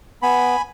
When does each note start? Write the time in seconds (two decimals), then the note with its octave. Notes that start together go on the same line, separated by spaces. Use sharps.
0.22 B3 G#5 B5